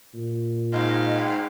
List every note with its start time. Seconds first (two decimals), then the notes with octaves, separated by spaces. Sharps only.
0.14 A#2
0.73 G#2 D#5 F5
1.16 G5